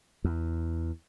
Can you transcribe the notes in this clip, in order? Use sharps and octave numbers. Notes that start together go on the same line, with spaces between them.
E2